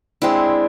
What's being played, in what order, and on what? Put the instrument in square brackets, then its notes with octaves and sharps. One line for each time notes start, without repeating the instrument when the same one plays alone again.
[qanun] G#3 C4 E4 [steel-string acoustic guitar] D4